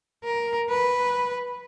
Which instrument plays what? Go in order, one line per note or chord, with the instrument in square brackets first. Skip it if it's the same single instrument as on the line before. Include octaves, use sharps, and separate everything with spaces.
[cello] A#4
B4